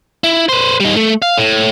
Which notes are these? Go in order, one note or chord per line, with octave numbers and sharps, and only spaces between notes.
E4
B4 C5
G3 D#4
A3
F5
A2